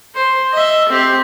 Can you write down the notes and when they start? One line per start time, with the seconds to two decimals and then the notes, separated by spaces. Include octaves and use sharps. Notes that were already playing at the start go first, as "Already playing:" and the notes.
0.15 C5
0.53 D#5 E5
0.89 C4 G4